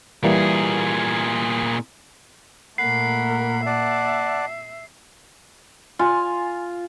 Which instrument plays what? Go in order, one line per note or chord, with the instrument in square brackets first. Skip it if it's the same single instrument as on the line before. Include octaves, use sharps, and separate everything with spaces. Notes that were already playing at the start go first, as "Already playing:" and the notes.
[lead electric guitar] A#2 G#4 [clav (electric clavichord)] E3 G3 A#3
[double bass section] A#2 A#3 [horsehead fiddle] A3 A#4 [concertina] F#5 B5 [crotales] C7
[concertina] D5 F#5 A5 [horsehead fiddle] E5
[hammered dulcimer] F4 [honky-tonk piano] G#5